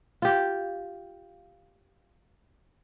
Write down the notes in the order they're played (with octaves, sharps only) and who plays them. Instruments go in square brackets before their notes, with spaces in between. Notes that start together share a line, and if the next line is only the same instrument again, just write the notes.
[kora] F4 G4